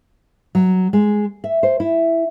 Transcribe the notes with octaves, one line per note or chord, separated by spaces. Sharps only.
F#3
G#3
E5
C5
E4